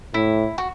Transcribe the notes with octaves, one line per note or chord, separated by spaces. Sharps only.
A2 E4
F#4